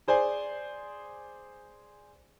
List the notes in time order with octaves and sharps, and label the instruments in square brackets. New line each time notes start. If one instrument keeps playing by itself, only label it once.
[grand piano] G#4 C5 D5 G#5